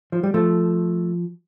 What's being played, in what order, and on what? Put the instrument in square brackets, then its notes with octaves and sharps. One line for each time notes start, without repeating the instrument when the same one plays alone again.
[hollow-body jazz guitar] F3
G3
F3 A3